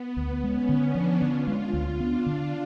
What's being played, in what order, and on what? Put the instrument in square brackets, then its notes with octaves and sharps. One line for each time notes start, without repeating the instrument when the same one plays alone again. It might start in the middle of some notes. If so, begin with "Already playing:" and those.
Already playing: [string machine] B3
[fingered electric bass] D2
[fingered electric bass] G#3 [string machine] C#4
[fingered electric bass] D3
[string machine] D4
[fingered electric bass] F3
[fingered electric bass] D3 [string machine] F4
[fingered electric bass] G#3
D2
[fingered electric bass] B3 [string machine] D4
[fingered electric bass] D3